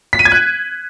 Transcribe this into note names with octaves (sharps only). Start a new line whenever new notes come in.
B6
D#7
G#6
F#6